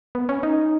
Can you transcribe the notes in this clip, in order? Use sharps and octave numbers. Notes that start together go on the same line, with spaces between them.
B3
C#4
D#4